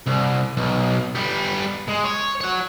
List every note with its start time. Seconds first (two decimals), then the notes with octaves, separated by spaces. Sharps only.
0.07 C2
0.57 B1
1.15 G3 B3
1.88 G#3
2.04 C#5
2.41 C#5 F#5